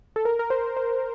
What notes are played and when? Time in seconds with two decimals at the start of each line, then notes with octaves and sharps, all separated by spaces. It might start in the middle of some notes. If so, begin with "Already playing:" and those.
0.16 A4
0.25 A#4
0.39 A#4
0.50 C5
0.77 C5